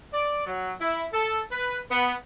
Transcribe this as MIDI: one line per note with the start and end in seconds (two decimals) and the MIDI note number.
0.13 0.46 74
0.47 0.74 54
0.81 1.05 64
1.13 1.41 69
1.52 1.79 71
1.91 2.13 59